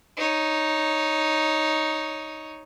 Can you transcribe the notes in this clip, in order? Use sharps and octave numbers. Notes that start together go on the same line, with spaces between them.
D#4 C#5